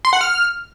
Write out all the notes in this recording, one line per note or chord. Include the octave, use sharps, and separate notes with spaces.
C6
F#5
F6